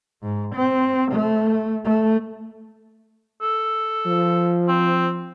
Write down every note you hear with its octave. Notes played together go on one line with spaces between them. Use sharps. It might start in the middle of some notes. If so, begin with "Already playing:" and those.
G#2
C4
A3
A3
A4
F3
C4